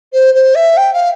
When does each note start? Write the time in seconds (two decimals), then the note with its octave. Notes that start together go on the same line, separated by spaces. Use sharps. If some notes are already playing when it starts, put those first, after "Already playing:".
0.13 C5
0.34 C5
0.55 E5
0.77 G5
0.93 F5